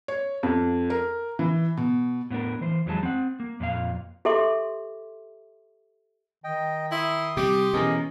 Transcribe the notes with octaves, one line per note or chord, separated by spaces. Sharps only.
C#5
F2
A#4
E3
B2
A2 B3 D4 A#4
E3 C5
F2 E3 F#3 G#3 A5
C4 F#5
A#3
F2 A#2 D4 F5
G4 A4 E5 C6 D6
D#3 D#5 G5
E4 C6 D#6
C3 G3 G4
B2 E3 C#4 G#4 A#4 D#5